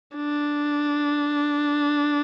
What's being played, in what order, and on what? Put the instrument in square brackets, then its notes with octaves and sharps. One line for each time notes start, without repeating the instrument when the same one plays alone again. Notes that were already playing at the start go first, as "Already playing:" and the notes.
[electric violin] D4